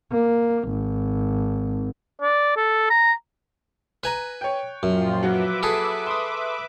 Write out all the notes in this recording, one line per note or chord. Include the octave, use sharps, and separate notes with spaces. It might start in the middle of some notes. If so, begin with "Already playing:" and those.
A#3
G#1
D5
A4
A#5
B4 G#5 A#5 F#6
C#5 G5
F#2 A#2 F3 F4
F#3 F#4 B4 E5 D6
G#4 A4
C6 D#6